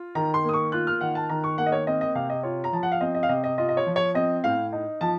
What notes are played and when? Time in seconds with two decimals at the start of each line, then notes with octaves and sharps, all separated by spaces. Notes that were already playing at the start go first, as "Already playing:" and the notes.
Already playing: F4
0.15 D#3 A#5
0.34 C6
0.44 A#3
0.49 D#6
0.54 C#6
0.72 F4 F#6
0.87 F6
1.01 D#3 F#5
1.15 A5
1.29 D#3 A#5
1.44 C#6
1.58 A#3 F#5
1.66 D#5
1.72 C#5
1.87 C4 D#5
2.01 D#5
2.15 C3 F5
2.30 D#5
2.43 F4 C#5
2.64 A#5
2.72 F3 A5
2.83 F#5
2.92 F5
3.01 C4 D#5
3.15 D#5
3.23 F5
3.29 C3 D#5
3.44 D#5
3.58 F4 D#5
3.69 D#5
3.77 C#5
3.86 F3
3.96 C#5
4.14 C4 D#5
4.44 A2 F5
4.73 D#4
5.01 F3 A5